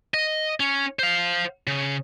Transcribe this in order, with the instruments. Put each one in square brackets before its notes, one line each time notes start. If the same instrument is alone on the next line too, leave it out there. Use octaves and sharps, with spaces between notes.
[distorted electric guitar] D#5
C#4
C5 F5
C#3